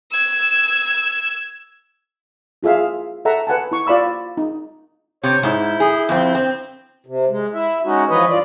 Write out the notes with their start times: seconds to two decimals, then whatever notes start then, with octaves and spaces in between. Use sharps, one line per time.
0.11 E6 G#6
2.63 E4 F4 G#4 E5 F5
3.25 A4 E5 F#5 A#5
3.47 B4 F#5 G#5 A5
3.72 E4 C#6
3.87 F4 D5 F5 B5 E6
4.37 D#4
5.23 C3 C#5
5.43 G#2 E4 G6
5.80 G#4
6.09 F2 C4
6.35 C4
7.06 C3
7.29 G#3
7.54 E4 E5
7.85 G#3 C#4 D#4 F#4
8.09 E3 F3 B4 C#5 D#5
8.30 G2 F4 D5